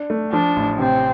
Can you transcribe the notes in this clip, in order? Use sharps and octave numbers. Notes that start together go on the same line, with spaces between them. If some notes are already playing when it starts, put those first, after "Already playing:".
Already playing: D4
A3
F3 D4
A1
C3 C4